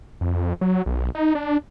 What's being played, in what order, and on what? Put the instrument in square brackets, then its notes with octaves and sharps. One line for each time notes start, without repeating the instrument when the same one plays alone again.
[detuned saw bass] F2
F#3
B1
D#4
D4